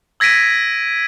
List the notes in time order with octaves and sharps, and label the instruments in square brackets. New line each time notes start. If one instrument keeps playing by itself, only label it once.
[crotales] E6 G#6 A#6 B6 D7 D#7